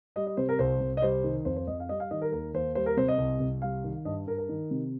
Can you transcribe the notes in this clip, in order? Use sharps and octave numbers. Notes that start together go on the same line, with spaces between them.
G3 D#5
D#5
C3 C5
A#4
C2 C5
C2
D#5
G3 C5
D#3
F2 C5
C5
F2 D#5
F5
G3 D#5
F5
D#3 D#5
A#4
D#2 A#4
D#2 C5
G3 C5
A#4
C3 C5
D#5
C2
C2
G3 F5
D#3
G2 D#5
G2 A#4
A#4
D#3
C3